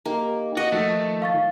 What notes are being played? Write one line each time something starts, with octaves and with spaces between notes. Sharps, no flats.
A#3 D#4 G4
F#4 D#5
D#3 F3 A3
F5 C#6 A6